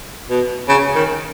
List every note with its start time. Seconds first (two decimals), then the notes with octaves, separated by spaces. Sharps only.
0.30 B2
0.69 C#3
0.95 D#3